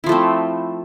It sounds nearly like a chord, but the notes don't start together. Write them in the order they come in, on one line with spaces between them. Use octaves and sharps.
E4 F3 A3 C4